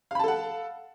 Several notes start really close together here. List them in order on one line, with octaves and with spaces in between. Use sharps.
F5 B5 A5 A4 F#5